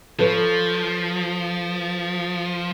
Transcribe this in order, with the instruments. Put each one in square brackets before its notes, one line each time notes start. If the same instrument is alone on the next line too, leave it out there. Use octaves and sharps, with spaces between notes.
[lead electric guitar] F3 [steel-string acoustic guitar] A4 B4 C#5